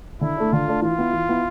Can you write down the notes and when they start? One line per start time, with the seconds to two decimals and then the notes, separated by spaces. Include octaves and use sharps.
0.21 D3 E4
0.37 A3 D4
0.53 D3 F4
0.68 A3 D4
0.82 E3 F4
0.98 B3 E4
1.13 E3
1.29 B3 E4